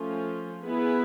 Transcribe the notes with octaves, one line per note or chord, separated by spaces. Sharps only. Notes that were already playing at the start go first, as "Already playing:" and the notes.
Already playing: F3 A3 C#4 F4
B3 E4 G#4 B4